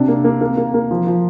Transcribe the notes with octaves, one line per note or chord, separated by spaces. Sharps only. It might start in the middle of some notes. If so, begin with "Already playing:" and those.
Already playing: C3 D4
A#3
A#3
A#3
A#3
A#3
F3
F3